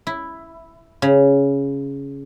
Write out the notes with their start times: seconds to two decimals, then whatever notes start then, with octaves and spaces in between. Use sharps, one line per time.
0.07 E4
1.02 C#3